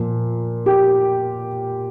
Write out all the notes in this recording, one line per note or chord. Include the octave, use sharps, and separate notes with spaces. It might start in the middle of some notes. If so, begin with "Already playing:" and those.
Already playing: A#2 F3
G4